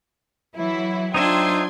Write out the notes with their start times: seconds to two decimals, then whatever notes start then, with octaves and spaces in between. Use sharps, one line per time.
0.56 E3 F#3 E4
1.14 D4 D#4 F4 C5 E5 G5 C6 G#6